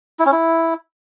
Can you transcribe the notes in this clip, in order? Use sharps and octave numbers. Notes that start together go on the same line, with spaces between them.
E4
C#4
E4